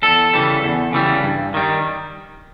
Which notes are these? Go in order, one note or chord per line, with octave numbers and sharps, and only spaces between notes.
E2 A4
C#3 E3 G3
E2
C#3 E3 G3
G2
D#3 G3